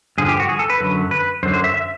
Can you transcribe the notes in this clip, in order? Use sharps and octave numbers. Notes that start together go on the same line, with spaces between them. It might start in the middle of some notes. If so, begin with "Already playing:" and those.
G2 D3 F3 G#4
G4
F#4
G#4
A4
B4
F#2 D3 F#3
B4
F#2 D3 F#3 C5
C5
E5
E5